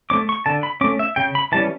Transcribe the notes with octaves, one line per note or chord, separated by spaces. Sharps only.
A3 C#4 D6
C#6
D3 A5
B5
A3 C#4 D6
E5
C#3 G5
B5
E3 G3 C#4 A5